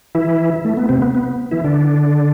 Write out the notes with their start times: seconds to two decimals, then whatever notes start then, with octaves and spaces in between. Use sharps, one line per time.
0.15 E3 E4
0.65 A3
0.77 B3
0.89 C3 C4
1.02 B3
1.15 B3
1.51 E3 E4
1.64 D3 D4